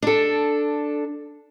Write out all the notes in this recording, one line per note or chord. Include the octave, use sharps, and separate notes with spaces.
D4 A4